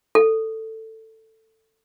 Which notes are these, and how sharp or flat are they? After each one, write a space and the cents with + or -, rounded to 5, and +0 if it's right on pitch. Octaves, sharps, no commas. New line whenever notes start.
A4 +15